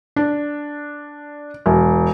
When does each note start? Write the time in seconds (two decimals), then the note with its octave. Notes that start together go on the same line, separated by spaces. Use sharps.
0.16 D4
1.66 E1